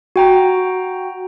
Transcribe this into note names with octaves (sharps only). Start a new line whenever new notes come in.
F#4 G5 A#5